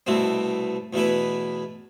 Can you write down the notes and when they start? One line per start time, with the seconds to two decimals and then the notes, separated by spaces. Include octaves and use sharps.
0.07 C2 B2 A3 C4
0.93 E2 B2 A3 E4 B4